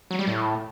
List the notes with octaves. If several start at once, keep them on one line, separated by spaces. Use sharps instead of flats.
F#3
G3
A2